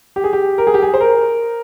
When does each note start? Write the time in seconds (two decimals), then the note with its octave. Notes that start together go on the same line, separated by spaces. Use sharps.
0.16 G4
0.24 G#4
0.33 G4
0.58 A#4
0.67 G#4
0.74 G4
0.82 G#4
0.94 C5
1.01 A#4